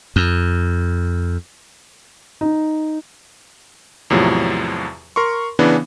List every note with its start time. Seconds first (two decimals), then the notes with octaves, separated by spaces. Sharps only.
0.16 F2
2.41 D#4
4.10 E2 A2 C3 F3 F#3
5.16 A#4 C6 C#6
5.59 C#3 E3 B3 D4